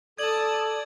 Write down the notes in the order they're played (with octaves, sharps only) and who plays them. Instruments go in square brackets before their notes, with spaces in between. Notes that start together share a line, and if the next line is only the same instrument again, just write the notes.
[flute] A4 [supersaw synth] D5 [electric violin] A5 D#6 [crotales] G#6 F#7